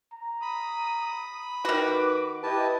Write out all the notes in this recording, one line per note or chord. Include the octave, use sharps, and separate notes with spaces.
A#5
B5 D#6
D#3 F#4 B4 D6
E4 G4 B4 D#5 A5